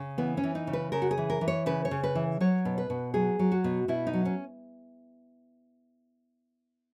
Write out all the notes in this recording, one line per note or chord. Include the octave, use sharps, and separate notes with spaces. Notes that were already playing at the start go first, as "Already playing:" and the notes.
Already playing: C#3
E3 B3
C#4
E3
D#4
C#3
B4
C#3 A#4
F#4
G#4
E3
A#4
E3
C#5
C#3 B4
C#5
C#3
B4
E3
F#3 C#5
B2
B4
B2
F#3 G#4
F#3
F#4
B2
B2 E4
D#4
F#3
C#4